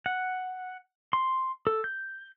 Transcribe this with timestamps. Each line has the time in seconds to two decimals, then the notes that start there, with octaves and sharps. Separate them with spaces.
0.06 F#5
1.13 C6
1.67 A4
1.84 G6